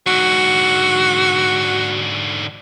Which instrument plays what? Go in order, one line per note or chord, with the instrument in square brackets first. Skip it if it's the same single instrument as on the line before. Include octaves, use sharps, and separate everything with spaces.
[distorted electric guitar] G#2 D3 [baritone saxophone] F#4